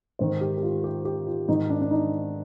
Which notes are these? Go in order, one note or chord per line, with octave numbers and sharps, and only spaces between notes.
G#2 D#3 C5
G4
G4
F4
G4
G4
F4
G#2 D#3 D#4
D4
D4
D#4